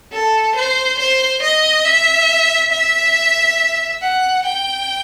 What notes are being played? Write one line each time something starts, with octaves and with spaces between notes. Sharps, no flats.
A4
C5
C5
D#5
E5
E5
F#5
G5